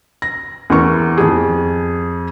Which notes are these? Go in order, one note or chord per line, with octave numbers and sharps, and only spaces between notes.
A#6
E2 A#4 C#6
F2 G#4